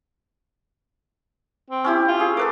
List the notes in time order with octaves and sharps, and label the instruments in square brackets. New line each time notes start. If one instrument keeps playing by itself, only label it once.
[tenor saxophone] C4
[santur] C#4 E4 G4
[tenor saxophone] F4
[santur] G#4
[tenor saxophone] A#3 [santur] A4 B4 D6